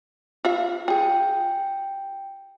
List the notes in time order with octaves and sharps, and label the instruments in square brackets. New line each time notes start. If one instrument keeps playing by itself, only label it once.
[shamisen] F4 E5 F5
[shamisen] F4 G#4 [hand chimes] G5